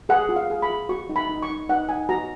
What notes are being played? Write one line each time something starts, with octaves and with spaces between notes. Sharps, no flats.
G#4 F#5
F4
F5
G#4
B5
F4
F#4 C#6
D#4
B5
D#4
C#6
D#4
D#4 F#5
D#4 G#5
F#4 A#5